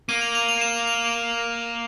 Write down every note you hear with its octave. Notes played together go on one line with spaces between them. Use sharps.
A#3 D#7
F7
F7
F7
E7
F7